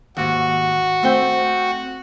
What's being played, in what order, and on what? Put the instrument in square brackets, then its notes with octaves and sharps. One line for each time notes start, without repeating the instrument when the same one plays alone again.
[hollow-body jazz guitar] D#2 G#2 [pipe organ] F#4
[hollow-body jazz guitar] A3 C4 G5